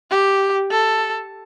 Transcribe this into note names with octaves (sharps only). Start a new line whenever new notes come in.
G4
A4